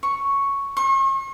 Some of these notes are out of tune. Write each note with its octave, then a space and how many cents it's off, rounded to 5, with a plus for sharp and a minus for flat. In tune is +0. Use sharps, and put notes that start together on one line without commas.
C#6 +0
C#6 -40